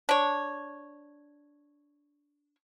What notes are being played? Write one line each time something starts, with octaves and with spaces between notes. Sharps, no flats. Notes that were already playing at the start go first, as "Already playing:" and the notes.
D4 C#5